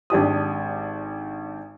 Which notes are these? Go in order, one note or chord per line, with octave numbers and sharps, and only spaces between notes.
G#1 D4 G4 D#6